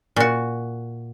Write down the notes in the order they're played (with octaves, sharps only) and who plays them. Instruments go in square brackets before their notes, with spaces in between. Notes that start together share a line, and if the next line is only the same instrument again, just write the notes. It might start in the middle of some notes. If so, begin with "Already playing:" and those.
[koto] A#2 F#4